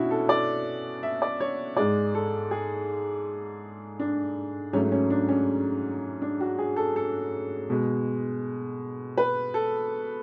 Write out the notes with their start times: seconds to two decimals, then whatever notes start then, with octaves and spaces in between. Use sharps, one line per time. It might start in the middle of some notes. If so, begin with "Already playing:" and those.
Already playing: B2 C#4 D4 E4 F#4
0.11 A4
0.29 D5
1.03 E5
1.22 D5
1.40 C#5
1.77 G#2 G#3 D5
2.15 A4
2.51 G#4
4.00 D4
4.73 G#2 F#3 A3 C#4
4.92 C#4
5.10 D4
5.29 C#4
6.22 D4
6.40 F#4
6.59 G#4
6.76 A4
6.96 A4
7.70 B2 G#3
9.18 B4
9.54 A4